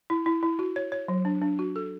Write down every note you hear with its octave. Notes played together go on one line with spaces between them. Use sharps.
E4
E4
E4
F#4
C#5
C#5
F#3
D4
D4
F#4
A4